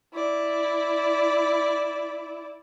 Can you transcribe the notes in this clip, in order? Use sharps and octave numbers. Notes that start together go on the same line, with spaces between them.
E4 D5